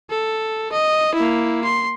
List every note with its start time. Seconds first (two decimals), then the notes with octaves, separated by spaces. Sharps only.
0.10 A4
0.72 D#5
1.15 A#3 E4
1.64 C6